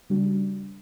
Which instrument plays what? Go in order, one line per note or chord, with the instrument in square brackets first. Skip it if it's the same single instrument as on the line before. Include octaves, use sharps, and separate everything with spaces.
[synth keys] C#3 G3 D4 F#4